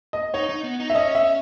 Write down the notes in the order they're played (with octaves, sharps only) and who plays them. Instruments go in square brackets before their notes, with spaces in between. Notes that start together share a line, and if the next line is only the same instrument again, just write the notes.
[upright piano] D#5
[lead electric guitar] D#4 [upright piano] C#5
[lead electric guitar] D#4
B3
D#4
[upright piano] E5
[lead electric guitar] C#4 [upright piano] D#5
[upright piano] E5